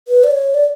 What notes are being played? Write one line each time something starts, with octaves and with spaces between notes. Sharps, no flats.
B4
D5
C#5
D5